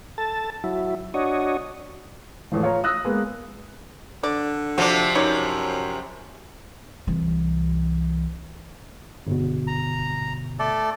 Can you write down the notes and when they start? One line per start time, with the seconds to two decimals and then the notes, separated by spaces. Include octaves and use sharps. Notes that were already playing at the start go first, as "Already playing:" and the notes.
0.18 A4 A5
0.64 F#3 E4
1.14 D4 F#4 C#5 D#5
2.52 E2 A2 F3
2.63 F4 C#5 A#5
2.84 D#6 E6 F#6 A#6
3.05 G#3 A#3 B3
4.23 D3 D5
4.78 C3 F3 F#4 D5
5.15 F#2 D#4 C#5 D5
7.07 C2 E3
9.27 G1 B2
9.67 A#5
10.59 A3 A4 D5